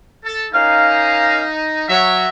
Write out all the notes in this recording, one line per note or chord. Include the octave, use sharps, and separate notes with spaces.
A4
A#3 C#4 D#4 F5
F#3 F#4 E5